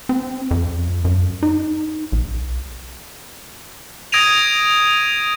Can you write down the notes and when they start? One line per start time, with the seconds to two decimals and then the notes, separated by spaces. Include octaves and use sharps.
0.09 C4
0.51 F2
1.05 F#2
1.43 D#4
2.12 B1
4.12 D#6 G#6 A#6 D7 D#7 F7